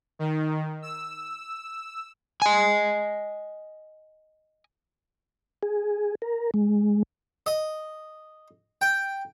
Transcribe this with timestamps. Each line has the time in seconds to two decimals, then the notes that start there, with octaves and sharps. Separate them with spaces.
0.19 D#3
0.82 E6
2.42 D#5 G#5
5.63 G#4
6.22 A#4
6.54 G#3
7.46 D#5
8.81 G5